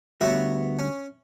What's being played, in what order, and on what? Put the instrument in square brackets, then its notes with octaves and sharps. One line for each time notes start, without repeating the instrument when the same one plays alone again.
[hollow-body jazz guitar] D2 G3 F#4 [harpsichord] B3 C#5 E5
[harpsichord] C#4